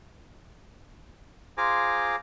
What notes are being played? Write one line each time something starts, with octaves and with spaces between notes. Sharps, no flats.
F4 G#4 C5 G#5 A#5 D6